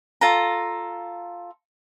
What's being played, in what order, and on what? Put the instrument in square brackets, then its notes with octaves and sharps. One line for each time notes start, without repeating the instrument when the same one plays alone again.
[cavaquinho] F4 A4 A#5